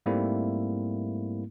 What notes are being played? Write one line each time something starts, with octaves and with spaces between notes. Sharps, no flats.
G#2 G3 A3 A#3 C4 E4